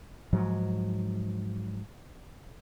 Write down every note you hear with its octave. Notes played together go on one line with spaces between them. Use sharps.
G#2 F3 F#3